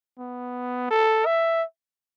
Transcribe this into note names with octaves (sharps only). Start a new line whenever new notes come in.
B3
A4
E5